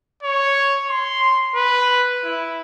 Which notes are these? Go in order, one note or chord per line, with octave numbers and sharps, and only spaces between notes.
C#5
C6
B4
E4